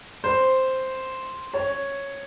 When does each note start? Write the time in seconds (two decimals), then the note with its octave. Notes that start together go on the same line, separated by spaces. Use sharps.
0.24 C5
1.54 C#5